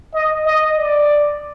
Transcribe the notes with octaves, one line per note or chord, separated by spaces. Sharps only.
D#5
D#5
D5